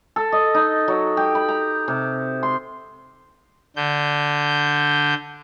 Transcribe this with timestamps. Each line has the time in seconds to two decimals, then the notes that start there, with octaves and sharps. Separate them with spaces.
0.16 A4
0.32 D#5
0.54 D#4
0.88 F#3
1.17 G4
1.35 B5
1.48 A#5
1.88 C3
2.43 C6
3.76 D3 G6